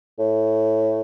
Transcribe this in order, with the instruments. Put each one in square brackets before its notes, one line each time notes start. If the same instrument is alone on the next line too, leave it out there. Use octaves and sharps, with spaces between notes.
[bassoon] A2